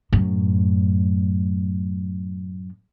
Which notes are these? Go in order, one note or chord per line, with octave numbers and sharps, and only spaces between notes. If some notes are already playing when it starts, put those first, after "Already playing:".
F#2 A2